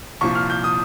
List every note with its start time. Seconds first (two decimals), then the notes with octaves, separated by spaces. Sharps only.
0.21 C2 A#2 F3 C#6
0.35 F6
0.50 G6
0.64 D#6